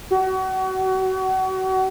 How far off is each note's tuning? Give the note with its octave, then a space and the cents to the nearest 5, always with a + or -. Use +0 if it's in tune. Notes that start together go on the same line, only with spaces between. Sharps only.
F#4 +30